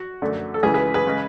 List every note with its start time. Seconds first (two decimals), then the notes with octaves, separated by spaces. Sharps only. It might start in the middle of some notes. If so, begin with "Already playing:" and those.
Already playing: F#4
0.22 F#2 D3 A3
0.54 A4
0.63 C#2 C#3 E3 G#4 B4
0.74 G#4 B4
0.94 G#4 B4
1.07 C#3 G#3